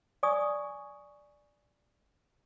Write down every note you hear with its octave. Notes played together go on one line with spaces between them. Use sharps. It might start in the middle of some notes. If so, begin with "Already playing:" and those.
D5 G#5 C#6 D#6